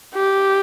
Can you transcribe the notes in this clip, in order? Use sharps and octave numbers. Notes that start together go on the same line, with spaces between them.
G4